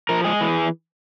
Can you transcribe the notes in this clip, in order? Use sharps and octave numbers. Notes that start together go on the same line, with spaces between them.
F3 A#4
G#3 G#4
E3